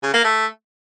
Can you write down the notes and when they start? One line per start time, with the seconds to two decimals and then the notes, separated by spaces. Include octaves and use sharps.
0.03 C#3
0.14 A#3
0.24 A3